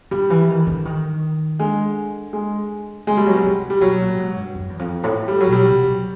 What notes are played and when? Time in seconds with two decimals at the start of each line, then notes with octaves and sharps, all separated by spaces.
0.11 D3 G3
0.30 E3
0.49 D#3
0.67 D3
0.85 D#3
1.59 D3 G#3
2.33 G#3
3.07 C#3 G#3
3.17 A#2 G3
3.27 F#3
3.33 B2 G3
3.43 C3
3.70 G3
3.81 B2 F#3
3.99 A#2
4.17 G#2
4.36 G2
4.55 F#2
4.69 E2
4.79 F2
5.03 A2
5.28 G3
5.41 F#3
5.47 B2
5.52 G3
5.65 C3
5.84 F#3